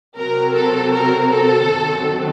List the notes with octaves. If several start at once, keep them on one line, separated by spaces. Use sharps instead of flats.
C3 F#3 C4 A#4
A4
A#4
A4
F#2 D#3 F#3 C4